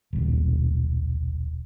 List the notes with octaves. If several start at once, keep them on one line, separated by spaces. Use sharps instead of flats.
D#1 B1